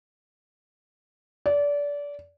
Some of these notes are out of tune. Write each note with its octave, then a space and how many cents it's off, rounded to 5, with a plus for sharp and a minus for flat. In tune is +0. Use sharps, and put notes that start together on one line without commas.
D5 -25